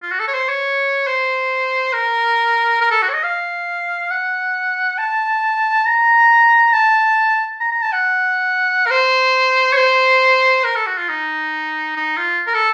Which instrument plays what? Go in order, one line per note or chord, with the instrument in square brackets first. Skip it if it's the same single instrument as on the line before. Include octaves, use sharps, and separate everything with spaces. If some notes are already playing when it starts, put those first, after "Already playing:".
[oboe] F4
F#4
A4
C#5
C5
C#5
C5
A#4
A#4
A4
F#4
C#5
D#5
F5
F#5
A5
A#5
A5
A#5
A#5
A5
F#5
A#4
C5
C#5
C5
A#4
A4
F#4
F4
D#4
D#4
F4
A#4
A4